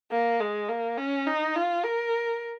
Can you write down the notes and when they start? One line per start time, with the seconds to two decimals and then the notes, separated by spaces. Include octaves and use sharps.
0.12 A#3
0.41 G#3
0.69 A#3
0.97 C#4
1.27 D#4
1.56 F4
1.84 A#4